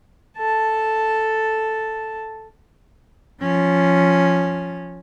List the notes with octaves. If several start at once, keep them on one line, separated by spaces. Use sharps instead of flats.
A4 A5
F3 C#4